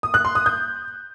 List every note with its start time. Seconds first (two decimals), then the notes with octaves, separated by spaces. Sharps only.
0.03 D#6
0.14 F#6
0.25 C6
0.35 D#6
0.46 G6